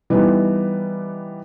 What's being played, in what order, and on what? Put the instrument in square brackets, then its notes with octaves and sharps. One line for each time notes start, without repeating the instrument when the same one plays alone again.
[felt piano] E3 G3 B3 D#4